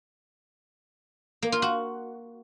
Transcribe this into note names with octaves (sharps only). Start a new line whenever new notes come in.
A#3
F4
F#4